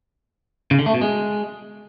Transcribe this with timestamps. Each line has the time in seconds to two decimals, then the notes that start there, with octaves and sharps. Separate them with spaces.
0.71 C#3
0.79 D3
0.86 A3
0.94 B2
1.01 G#3